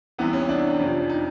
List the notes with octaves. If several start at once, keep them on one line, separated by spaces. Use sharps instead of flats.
C2 C3 E3 B3
C#4
D4
F2 C3 F3
D#4